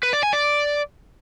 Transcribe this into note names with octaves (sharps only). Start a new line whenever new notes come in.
B4
D5
G#5
D5